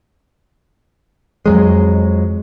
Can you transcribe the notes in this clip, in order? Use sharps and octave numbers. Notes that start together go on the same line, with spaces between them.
F2 F#3 G#3